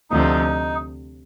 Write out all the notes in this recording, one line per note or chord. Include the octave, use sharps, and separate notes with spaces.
D2 C3 F3 D#4